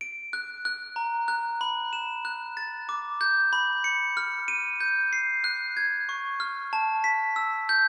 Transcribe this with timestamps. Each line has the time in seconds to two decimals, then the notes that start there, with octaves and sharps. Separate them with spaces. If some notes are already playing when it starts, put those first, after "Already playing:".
0.01 D7
0.33 F#6
0.65 F#6
0.96 A#5
1.28 F#6
1.61 B5
1.93 E7
2.25 F#6
2.57 A6
2.89 D6
3.21 G6
3.53 B5
3.84 C#7
4.17 F6
4.48 D#7
4.80 G6
5.13 C7
5.44 F#6
5.77 G#6
6.09 C#6
6.40 F6
6.73 A5
7.04 B6
7.36 E6
7.69 G6